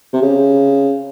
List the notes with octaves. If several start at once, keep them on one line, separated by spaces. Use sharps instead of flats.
C3
C#3